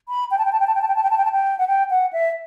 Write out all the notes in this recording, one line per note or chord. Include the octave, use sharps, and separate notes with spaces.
B5
G5
A5
G5
A5
G5
A5
G5
A5
G5
A5
G5
A5
G5
A5
G5
F#5
G5
F#5
E5